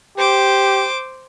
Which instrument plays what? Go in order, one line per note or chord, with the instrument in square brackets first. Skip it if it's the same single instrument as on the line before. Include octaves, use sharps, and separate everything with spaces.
[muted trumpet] G4 [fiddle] C5 D6